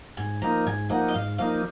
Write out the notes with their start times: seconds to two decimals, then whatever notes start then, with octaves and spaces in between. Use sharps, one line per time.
0.17 G#2 G#5
0.42 F3 A#3 D#4 A#5
0.66 G#2 G#5
0.89 F3 A#3 D#4 F#5
1.08 D#5
1.14 G#2 F5
1.38 F3 A#3 D#4 F5